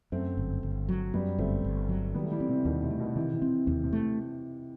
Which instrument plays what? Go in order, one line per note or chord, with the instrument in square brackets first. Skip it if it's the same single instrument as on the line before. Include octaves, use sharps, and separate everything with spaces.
[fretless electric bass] F#2 [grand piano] A3 C4
[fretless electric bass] G1
G1
F#3
[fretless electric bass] F#2 [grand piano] G3 B3
[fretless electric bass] G1 [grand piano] A3 C4
[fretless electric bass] G1
F#3
[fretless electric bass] D#3 [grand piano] G3 B3
[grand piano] A3
E3 G3
[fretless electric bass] C4
[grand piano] C3 E3
[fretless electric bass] D#2 [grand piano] B2 D#3
[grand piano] C3
[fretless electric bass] A3
[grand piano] B2 D#3
[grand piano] C3 E3 [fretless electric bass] D#3
[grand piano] C3 E3
[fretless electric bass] C4
[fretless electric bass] D#2 [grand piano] C3
[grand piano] C3
[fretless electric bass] A3